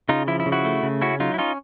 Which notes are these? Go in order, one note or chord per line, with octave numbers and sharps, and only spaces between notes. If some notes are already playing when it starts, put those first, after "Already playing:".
C#3 D#4 F4
F3 E4
E4
C#3
E4 F#4
A3
C#3
C#4 E4 F#4
F#3 D#4 F4
E4
C#4 D#4 F4